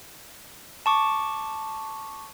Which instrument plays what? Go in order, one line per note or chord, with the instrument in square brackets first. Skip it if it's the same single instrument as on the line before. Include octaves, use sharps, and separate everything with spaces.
[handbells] A5 C#6 D6